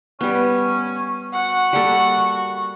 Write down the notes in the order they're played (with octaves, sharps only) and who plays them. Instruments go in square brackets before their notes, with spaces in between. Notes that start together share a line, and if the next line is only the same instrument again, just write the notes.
[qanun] G3 B3 [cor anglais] C#4
[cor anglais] F#4 [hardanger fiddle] F#5
[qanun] G3 A#3 A4